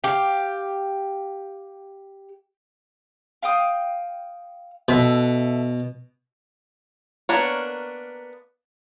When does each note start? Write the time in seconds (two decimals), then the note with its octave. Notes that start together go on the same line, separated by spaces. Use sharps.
0.04 G4 F5
3.42 F5 G5 D#6
4.89 B2 A4 E5 F#6
7.29 A#3 B3 D4 A#4 C#5